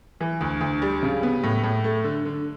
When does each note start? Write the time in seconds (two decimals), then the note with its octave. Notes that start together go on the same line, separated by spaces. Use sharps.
0.21 E3
0.41 D2
0.61 D2
0.82 G3
1.03 C#3
1.23 B3
1.43 A2
1.63 A2
1.84 A3
2.04 D3
2.25 D3